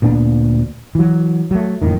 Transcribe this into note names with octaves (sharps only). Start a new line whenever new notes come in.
D2 A#2 B3 D4
E3 F#3
F#3 A3
F#1 F2 A2 D#3